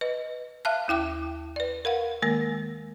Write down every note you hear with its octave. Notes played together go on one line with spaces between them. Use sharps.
B4 D#5
E5 F5 A5 F6 F#6
D#2 E4 G5 D6
B4 D5
A#4 F5 F#5
D#3 G#3 A#3 A#4